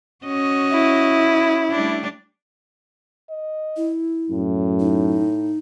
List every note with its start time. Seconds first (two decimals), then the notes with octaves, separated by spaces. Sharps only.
0.25 C#4 F#4 D#5
0.72 E4
1.71 G3 A3 D4
3.30 D#5
3.77 E4
4.30 F#2 A2
4.80 D#4